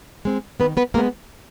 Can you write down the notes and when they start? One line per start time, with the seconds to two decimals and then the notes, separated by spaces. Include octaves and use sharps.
0.25 G#3 C4
0.60 D#3 B3 B4
0.77 B3 B4
0.94 G#3 A#3 A#4
0.98 B3